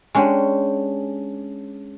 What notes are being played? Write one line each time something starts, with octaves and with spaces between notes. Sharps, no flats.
G#3 C#4 D4 G4